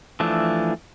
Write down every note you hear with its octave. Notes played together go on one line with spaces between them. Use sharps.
E3 F3 A3 D4